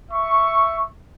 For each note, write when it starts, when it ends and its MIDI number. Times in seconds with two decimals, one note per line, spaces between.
0.11 0.85 76
0.11 0.85 85